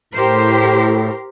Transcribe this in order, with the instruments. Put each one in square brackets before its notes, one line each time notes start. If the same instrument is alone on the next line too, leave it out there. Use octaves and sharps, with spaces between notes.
[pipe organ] A2 [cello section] G4 A#4 C5